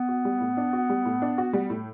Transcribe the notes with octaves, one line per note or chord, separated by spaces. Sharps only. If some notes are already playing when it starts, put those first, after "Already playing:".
Already playing: B3
F#4
G3
A2
D4
F#4
G3
A2
D4
F#4
G3
A2